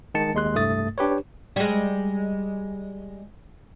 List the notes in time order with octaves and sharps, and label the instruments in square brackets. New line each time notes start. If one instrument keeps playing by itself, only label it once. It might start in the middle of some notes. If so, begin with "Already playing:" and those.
[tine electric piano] D#3 G#3 A5 C#7
D#2 G#3 C6 F#6
C2 G2 A3 D#6 A6
D4 G4 B4 C#5
[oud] G3 G#3